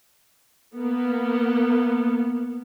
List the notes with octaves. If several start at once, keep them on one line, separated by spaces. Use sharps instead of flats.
A#3 B3